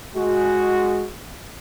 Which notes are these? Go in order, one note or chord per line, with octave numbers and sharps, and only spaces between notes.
G#3 F#4